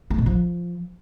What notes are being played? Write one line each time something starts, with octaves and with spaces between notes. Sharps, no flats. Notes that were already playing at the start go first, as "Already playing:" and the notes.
A3
B2
F3